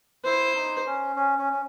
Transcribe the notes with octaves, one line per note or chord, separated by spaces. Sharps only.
E4 C5
D#4
C#4
C#4
C#4
C#4